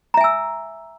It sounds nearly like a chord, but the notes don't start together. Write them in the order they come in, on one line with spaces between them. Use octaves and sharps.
A#5 E5 G#5 E6